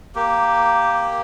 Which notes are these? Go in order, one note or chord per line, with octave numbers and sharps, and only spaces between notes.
A#3 G4